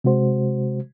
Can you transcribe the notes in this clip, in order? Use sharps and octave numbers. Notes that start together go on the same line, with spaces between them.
C3 G#3 F#4 C5